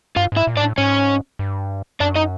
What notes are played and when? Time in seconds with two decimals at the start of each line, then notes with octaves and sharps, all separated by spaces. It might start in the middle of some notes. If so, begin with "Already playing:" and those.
0.16 G2 F4 F5
0.32 G#2 E4 E5
0.47 A#2
0.56 G#2 D4 D5
0.62 A2
0.78 G#2 C#4 C#5
1.39 G2
2.00 F#2 D4 D5
2.16 D#4 D#5